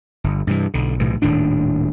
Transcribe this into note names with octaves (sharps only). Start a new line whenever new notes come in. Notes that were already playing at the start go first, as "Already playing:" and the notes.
G1
G2 C3 D#3 E3
B1 D3
B1 A2 C3 E3
D#1 A2 D#3 D4